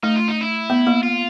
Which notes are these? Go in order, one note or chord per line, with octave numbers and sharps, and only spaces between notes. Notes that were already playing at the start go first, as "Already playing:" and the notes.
A3 D#4
F4
D#4
E4
B3
A#3
F4